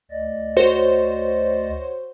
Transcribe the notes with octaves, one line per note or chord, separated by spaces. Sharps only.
D2 D5 D#5
F#4 C5 C#5